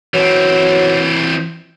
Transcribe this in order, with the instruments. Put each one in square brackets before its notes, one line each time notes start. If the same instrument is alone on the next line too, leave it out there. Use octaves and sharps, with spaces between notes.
[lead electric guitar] E3 C4 [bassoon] F#3